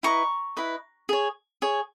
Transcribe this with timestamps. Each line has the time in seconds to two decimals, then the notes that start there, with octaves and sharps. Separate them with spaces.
0.03 E4 B4 D#5 A#5 C#6
0.57 E4 B4 D#5
1.09 G#4 C#5
1.62 G#4 C#5